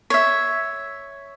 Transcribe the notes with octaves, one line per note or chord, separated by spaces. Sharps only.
C#5 E5